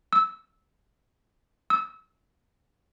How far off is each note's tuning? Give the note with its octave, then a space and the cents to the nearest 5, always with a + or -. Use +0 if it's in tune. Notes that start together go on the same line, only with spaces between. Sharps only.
E6 -15
E6 -30